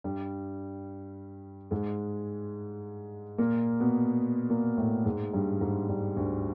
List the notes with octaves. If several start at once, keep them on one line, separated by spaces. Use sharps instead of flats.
G2 G3
G#2 G#3
A#2 A#3
B2 B3
A#2 A#3
A2 A3
G#2 G#3
G2 G3
G#2 G#3
G2 G3
D2 D3